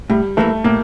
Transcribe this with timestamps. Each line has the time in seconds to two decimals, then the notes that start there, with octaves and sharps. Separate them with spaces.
0.10 A2 G3
0.37 E3 A3 A#3 E4
0.64 A2 A#3